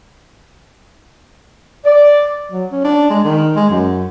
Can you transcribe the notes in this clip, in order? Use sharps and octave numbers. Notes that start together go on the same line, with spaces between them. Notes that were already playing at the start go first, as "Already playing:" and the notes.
D5
F#3
C#4
D4
G#3
D#3
G#3
F#2